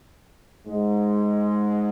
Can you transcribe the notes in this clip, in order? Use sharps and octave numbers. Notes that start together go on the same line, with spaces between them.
G#2 G#3